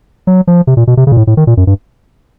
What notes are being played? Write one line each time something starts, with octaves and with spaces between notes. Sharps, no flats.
F#3
F3
C3
A#2
B2
C3
C#3
A#2
A2
A2
D#3
A#2
F#2
G2